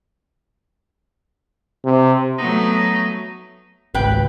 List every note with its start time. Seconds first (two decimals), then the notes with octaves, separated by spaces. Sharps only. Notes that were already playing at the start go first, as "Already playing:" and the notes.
1.85 C3
2.38 F#3 A3 B3 D#4
3.94 G#1 C#2 B4 G5